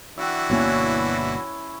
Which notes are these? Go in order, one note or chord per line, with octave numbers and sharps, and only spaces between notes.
E3 D4 F#4 E5 F#5 G5
G1 B2 A#3 C#4 E4 C#5